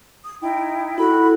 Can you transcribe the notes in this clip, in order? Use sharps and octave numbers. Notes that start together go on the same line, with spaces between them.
D#6
D#4 E4 G5
E4 F#4 A4 B5